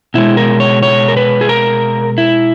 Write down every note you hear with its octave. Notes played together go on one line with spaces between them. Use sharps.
B2 G#3 E4
A#4
C#5
C#5
A#4
B4
G#4
A#4
E4